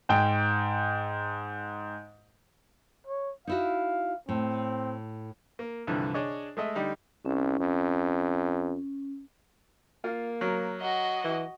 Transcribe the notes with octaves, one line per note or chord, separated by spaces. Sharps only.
G#2 G5
C#5
D#4 E4 F#4 F5
A2 C4
A#3
C2 G2 D3 E3 F3
D4 G#4 C#5 D#5
G#3 A3 D#5 E5
D3 G3 D#4
C2 C#4
F2
A#3 F4
F#3 A#4
F#4 D#5
E3